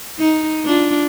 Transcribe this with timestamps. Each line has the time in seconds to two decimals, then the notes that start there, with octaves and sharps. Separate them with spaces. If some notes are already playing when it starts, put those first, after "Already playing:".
0.19 D#4
0.65 D4 F4